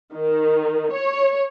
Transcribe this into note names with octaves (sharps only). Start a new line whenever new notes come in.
D#3
C#5